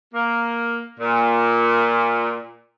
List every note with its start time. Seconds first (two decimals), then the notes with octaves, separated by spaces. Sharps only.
0.13 A#3
0.99 A#2